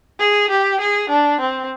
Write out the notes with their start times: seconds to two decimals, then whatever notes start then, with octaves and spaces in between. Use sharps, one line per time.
0.19 G#4
0.50 G4
0.80 G#4
1.09 D4
1.40 C4